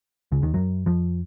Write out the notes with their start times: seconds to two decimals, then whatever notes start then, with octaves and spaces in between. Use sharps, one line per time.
0.32 C#2 C#3
0.42 D#2 D#3
0.54 F#2 F#3
0.86 F2 F3